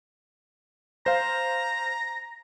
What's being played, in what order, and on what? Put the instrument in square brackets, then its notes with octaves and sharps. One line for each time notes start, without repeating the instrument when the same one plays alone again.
[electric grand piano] C5 F5 [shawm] A#5